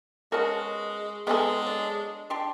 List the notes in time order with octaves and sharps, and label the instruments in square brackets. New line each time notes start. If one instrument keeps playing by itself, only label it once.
[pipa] B2 C#4 F#4 [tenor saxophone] G#3 [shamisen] A#4 A5
[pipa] C3 F3 G#4 [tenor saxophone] G#3 [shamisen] B3 A4
[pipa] F#3 D4
D4 G4 C6